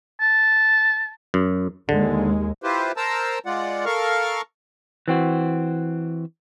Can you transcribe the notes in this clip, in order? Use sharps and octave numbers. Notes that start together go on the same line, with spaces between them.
A5
F#2
D#2 D3 G#3
E4 F4 G4 B4 C5
A#4 C5 A5 A#5 E6
G#3 F4 D5 F#5
A4 A#4 F5 C#6 F6
E3 C4 F#4